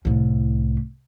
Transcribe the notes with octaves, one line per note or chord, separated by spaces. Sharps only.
C2 A2